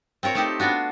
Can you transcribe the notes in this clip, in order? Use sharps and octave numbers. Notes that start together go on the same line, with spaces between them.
C4 F4 A#4 C#5
A3 D#4 G4
B3 D4 F4 F#4